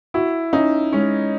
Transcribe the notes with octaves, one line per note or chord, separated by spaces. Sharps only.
E4 F#4
C#4 D#4
G#3 C#4